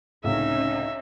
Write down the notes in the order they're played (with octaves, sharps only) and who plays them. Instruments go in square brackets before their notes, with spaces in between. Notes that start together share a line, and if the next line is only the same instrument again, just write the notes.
[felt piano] C#2 A2 C3 [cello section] C#4 D#4 [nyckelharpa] E5